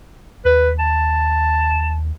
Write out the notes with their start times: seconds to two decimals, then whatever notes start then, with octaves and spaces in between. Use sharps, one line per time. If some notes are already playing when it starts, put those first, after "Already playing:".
0.45 D#2 B4
0.79 A5